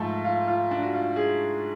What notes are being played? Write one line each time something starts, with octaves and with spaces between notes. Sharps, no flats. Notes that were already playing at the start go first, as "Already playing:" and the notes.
Already playing: G#2 F3 A3 A4
F4
F4
D4
F#4
F4
G#4